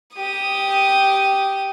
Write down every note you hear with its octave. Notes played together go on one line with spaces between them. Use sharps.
G4 D#6